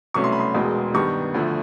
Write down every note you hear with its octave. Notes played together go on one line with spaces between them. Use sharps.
C2 B2 F#3 A3 C#4 C#6
C6
B5
C6
E1 E2 B2 G#3
G2 D#3 G3 B3 C#6
D2 D3 F3 A3